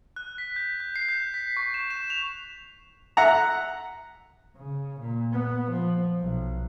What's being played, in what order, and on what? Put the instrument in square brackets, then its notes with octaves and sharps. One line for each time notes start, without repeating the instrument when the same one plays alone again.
[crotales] F#6
B6
G6
G6
C7
G6
B6
C#6
E7
E7
F7
[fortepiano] E5 F#5 A#5
[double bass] C#3
A#2
B3
F3
B1